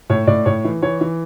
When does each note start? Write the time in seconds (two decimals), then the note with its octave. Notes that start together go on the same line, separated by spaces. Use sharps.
0.10 A2 C#5
0.27 A2 D5
0.45 A2 C#5
0.65 E3
0.82 E3 C#5
1.01 E3